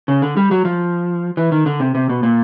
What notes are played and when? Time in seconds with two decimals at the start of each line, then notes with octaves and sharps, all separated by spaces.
0.08 C#3
0.22 D3
0.37 G3
0.51 F#3
0.65 F3
1.37 E3
1.52 D#3
1.66 D3
1.80 C3
1.95 C3
2.09 B2
2.23 A#2